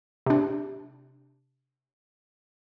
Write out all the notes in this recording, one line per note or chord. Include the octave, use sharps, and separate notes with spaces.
C3 D4